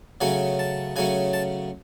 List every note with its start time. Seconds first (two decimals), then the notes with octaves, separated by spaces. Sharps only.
0.21 C#3 F#3 A3 C#4 G#5
0.59 A5
0.96 C#3 F#3 A3 C#4 G#5
1.33 A5